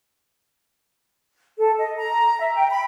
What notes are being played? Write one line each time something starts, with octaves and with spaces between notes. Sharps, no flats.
A4
D#5
A#5
E5
G5
B5